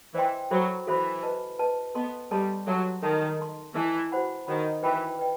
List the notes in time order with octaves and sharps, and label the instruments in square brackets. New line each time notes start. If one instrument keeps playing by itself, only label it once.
[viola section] E3 [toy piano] C5 D#5 G5 C6
[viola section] F#3 [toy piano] F#4 A4 C5 E5 B5
[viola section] E3 [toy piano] F#4 A4 C5 E5 B5
[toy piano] B4 D#5 A5
B4 D#5 A5
[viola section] B3 [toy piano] A4 D#5 A5 C6
[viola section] G3 [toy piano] A4 D#5 A5 C6
[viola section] F#3 [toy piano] A4 E5 A5 C6
[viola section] D#3 [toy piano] A4 E5 A5 C6
[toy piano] A4 D#5 A5 C6
[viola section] E3 [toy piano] A4 D#5 A5 C6
[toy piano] F#4 C5 F#5 B5
[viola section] D#3 [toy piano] F#4 C5 F#5 B5
[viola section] E3 [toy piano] B4 D#5 G5 B5
[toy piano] B4 D#5 G5